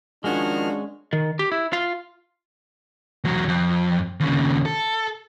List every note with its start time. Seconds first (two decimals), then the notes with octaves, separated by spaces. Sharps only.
0.24 D#3 F3 G#3 C#4 D4 F#4 G#4 F6
1.13 D#3
1.39 G4
1.52 E4
1.73 F4 F5
3.24 E2 F#3
3.48 F2
4.20 D#2 C#3
4.65 A4